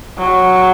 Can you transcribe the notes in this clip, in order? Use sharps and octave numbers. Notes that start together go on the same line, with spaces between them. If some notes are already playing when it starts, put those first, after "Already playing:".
F#3